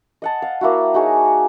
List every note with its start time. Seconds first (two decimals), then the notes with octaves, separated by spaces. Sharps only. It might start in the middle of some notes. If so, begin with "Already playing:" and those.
0.22 D#5 F#5 A5
0.42 F5
0.61 A#3 E4 F#4
0.94 D#4 F#4 G#4 C#5